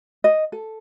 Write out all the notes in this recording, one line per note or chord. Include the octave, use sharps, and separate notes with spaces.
D#5
A4